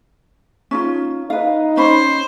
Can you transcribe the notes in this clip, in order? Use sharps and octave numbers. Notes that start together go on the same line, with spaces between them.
C#4 D#4 F4
D#4 B4 F5
C#4 C5 D#5 B5